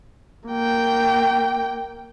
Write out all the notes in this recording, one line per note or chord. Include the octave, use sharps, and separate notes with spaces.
A#3 G5